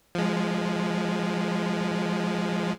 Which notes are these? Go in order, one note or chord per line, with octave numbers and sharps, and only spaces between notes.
F3 G#3